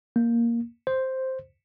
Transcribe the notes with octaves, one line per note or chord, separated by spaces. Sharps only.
A#3
C5